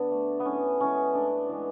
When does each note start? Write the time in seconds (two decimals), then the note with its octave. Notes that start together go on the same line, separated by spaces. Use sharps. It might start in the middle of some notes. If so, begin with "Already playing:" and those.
Already playing: D3 B3 D4
0.11 A3
0.40 B3
0.45 A2 C#4
0.80 E3 G#3 C#4
1.15 A2 D4
1.49 E3 G#3